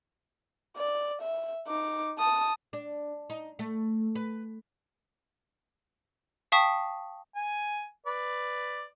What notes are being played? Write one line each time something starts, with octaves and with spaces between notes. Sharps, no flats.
D5
E5
D#4 D6
A5 D#6
D4
D#4
A3
B4
F5 G5 A5 C#6 D#6 B6
G#5
B4 D5